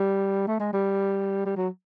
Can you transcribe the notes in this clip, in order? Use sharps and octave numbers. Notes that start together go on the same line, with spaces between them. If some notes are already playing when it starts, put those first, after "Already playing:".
Already playing: G3
A3
G#3
G3
G3
F#3